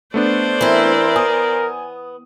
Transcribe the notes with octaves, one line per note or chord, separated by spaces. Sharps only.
A3 B3 D4 C5 D5
E3 C4 E4 A#4
B3 G#5 D#6